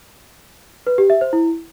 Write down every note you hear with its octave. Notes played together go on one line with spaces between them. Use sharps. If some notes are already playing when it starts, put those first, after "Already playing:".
B4
G4
E5
C5
E4